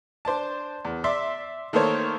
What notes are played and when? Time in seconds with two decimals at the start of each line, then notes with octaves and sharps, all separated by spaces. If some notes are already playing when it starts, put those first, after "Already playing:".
0.25 D4 C5 D5 A5
0.85 E2
1.04 D5 E5 C6
1.73 D#3 A3 A#3 A4 C5 C#5